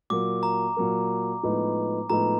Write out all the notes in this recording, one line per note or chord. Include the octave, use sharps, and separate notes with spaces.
A#2 F#3 A#3 D6
A#5
A#2 F#3 A#3
A2 F3 G#3 B3 D#4
A2 F3 G#3 B3 D#4 A#5